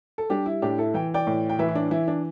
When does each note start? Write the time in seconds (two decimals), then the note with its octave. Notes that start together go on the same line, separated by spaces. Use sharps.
0.18 A4
0.30 G3 D4 G4
0.46 E4
0.62 A2 D4 G4
0.78 E4 A4
0.94 E3 G5
1.14 D5 G5
1.27 A2
1.49 G5
1.59 E3 B4 E5
1.68 E4
1.75 D4
1.91 E3 E4
2.08 D4